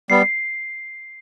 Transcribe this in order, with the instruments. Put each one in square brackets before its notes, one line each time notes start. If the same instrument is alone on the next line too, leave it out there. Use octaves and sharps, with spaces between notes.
[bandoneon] G3 B3 [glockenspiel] C7